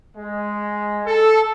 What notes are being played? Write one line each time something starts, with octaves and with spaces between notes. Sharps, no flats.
G#3
A4